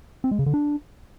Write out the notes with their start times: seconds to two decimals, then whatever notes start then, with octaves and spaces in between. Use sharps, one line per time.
0.24 C4
0.31 G#3
0.39 C#3
0.46 D3
0.54 D4